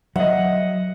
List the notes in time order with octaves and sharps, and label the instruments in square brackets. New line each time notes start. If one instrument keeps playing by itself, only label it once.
[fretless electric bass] F#3 [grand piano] D#5 E5 [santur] F#5